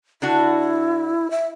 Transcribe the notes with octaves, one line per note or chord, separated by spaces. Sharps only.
D3 D4 E4 F#4
E5